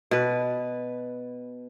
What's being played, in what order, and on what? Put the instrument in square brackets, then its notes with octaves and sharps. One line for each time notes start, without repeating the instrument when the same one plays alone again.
[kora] B2 B4